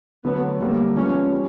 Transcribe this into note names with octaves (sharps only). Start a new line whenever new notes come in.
D3 F#3 A3 B3
D3 G3 A3 A#3
F3 G#3 B3 C#4
G3